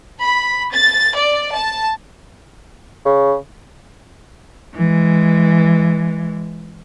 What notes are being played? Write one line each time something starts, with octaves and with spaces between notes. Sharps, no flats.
B5
A6
D5
A5
C#3
E3 G#3